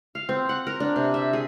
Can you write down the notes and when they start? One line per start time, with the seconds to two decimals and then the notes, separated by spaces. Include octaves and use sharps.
0.15 F5
0.29 C4
0.49 F#5
0.67 A#4
0.80 D4
0.96 C3
1.14 E5
1.33 G#4